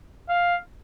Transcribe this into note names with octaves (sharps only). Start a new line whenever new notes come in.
F5